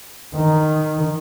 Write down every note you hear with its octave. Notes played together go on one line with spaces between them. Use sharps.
D#3